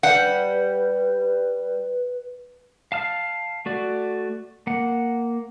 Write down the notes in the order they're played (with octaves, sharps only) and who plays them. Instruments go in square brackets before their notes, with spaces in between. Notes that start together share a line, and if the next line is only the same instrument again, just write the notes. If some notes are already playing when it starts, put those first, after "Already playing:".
[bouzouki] G3 [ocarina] B4 [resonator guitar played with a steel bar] F#5
[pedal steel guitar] F5 A5 F6
A3 F#4 D5
A#3 F#5